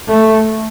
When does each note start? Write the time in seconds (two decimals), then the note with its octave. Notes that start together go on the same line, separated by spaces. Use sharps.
0.09 A3